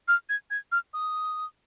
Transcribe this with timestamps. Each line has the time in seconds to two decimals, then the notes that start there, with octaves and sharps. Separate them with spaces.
0.08 F6
0.29 G#6
0.50 G#6
0.72 F6
0.93 D#6